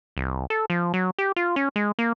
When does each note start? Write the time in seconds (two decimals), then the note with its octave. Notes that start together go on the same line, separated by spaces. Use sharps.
0.17 C2
0.50 A4
0.70 F3
0.94 F#3
1.19 G4
1.36 F4
1.56 C#4
1.76 G#3
1.99 A#3